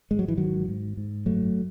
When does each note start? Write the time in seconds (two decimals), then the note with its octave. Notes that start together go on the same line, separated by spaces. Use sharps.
0.11 G#1 G#3
0.19 F#3
0.28 E3
0.37 G#2 D#3 F#3
0.68 G#2
0.97 G#2
1.26 F#1 F#3 A3